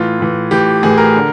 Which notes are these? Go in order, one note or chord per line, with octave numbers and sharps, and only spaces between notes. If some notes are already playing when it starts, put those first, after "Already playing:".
Already playing: A2 E3 F4
A2 E3
A2 E3 G4
A2 E3 G#4
A#4
D3